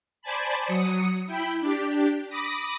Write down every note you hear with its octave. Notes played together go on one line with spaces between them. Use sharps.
C5 D5 G#5 A5 B5
F#3 D#6 C#7
E4 G5 B5
D4 G4
B5 D6 D#6 A#6 B6